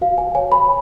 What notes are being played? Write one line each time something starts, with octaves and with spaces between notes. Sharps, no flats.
F#4 F5
G#5
C#5 G#5
B5